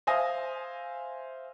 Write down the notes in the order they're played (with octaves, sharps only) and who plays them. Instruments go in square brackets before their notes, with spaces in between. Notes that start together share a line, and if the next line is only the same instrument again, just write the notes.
[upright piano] C5 E5 F5 G#5 D#6 A#6